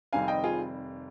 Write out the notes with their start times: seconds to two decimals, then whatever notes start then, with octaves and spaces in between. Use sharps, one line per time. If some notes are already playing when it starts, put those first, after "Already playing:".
0.13 F1 F2 D#3 G3 C4 F5 G#5
0.28 D#5 G5
0.44 F4 G#4